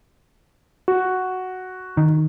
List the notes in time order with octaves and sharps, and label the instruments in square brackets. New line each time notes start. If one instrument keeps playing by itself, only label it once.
[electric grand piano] F#4
[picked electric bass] D#3